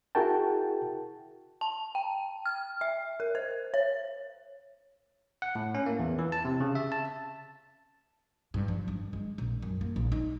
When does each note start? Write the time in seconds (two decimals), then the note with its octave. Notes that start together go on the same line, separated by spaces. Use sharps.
0.15 E4 F#4 G#4 A#4 G5 A5
1.61 A5
1.95 G5
2.46 F6
2.81 E5
3.20 A#4
3.35 C5
3.74 C#5
5.42 F#5
5.55 A2
5.75 C#4
5.86 A#3
5.99 E2
6.19 E3
6.32 A5
6.45 C3
6.60 C#3
6.75 E5
6.92 A5
8.54 G2
8.68 F3
8.88 G2
9.13 G#3
9.38 A#1
9.62 F#2
9.81 A#3
9.96 A#1
10.12 D#4